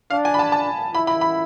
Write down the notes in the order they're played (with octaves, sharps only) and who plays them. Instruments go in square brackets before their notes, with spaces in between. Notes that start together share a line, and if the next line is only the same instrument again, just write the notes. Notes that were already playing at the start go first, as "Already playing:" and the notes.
[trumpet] D4 [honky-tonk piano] F5
[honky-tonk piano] G#5
B5
A5
A5
[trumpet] E4 [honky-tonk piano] B5
[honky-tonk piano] B5
B5